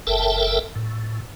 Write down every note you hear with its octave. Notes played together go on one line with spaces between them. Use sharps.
F#1 A4 A#4 E5 G5 A5
A2